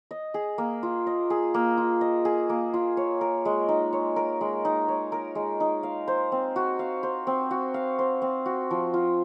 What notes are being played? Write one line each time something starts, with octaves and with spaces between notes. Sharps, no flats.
D#5
G#4
A#3
F4
D#5
G#4
A#3
F4
D#5
G#4
A#3
F4
C#5
A#4
G#3
D#4
C#5
A#4
G#3
D#4
C#5
A#4
G#3
D#4
F5
C5
C4
F#4
F5
C5
C4
F#4
F5
C5
C4
F#4
F3
F4